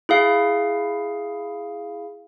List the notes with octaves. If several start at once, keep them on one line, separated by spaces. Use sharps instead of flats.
E4 G#4 F5